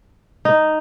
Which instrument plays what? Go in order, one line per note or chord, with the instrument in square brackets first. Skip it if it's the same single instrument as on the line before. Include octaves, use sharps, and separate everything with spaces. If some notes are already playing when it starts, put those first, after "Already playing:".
[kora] D#4